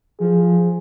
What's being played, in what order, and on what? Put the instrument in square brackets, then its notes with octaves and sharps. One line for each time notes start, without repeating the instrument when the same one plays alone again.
[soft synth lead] F3 [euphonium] G#4